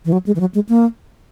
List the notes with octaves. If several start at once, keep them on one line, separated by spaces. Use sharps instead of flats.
E3
F#3
G#3
E3
F#3
G#3
A#3